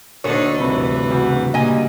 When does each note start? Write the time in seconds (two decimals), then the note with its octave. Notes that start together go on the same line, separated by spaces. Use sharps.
0.24 D2 A#2 D3 D4 D#4 A4 C#5
0.59 D2 G2 C3 E3 B5
1.10 C#3 F#4 G4
1.54 A#2 G3 A#3 D#5 G#5